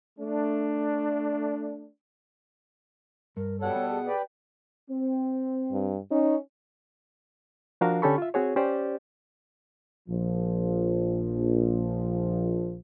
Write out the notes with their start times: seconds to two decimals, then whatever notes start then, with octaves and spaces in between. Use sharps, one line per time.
0.19 A3 D4
3.37 G2 A#4
3.60 B2 G3 A4 C#5 F#5
3.76 B3
3.91 G#4
4.07 G4 B4 D5
4.90 C4
5.72 G2
6.11 C#4 D#4
7.81 F3 D4 F#4 A#4 F5
8.02 D3 C#4 G4 A4 B5 C#6
8.18 F4 E5
8.34 C4 F#4 G#4 C#5
8.56 C#4 G4 C5 D5
10.08 A#1 F3